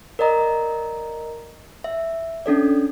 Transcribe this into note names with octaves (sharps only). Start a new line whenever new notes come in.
A#4 D5 D#5 A#5
E5
C#4 D4 A4 D5